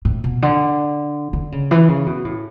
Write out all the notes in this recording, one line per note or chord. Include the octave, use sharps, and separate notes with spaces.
A2
B2
D3
D3
C#3
E3
C#3
B2
A2